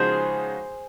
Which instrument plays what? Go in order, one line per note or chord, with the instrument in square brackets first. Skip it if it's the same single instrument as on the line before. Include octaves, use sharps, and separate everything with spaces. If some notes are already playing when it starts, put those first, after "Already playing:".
Already playing: [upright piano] C#3 F3 G#3 D#4 F#4 [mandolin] G#4 C5